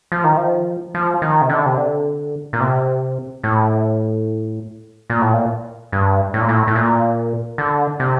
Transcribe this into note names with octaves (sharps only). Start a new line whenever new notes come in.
F3
D#3
F3
F3
D#3
C3
D3
C3
D3
A#2
C3
A2
A#2
A2
A#2
G2
A2
A#2
A2
A2
A#2
D3
C3